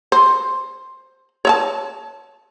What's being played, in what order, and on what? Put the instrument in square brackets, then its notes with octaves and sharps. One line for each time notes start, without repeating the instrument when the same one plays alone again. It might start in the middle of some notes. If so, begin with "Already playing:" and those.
[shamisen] C5
C#5 E5 A5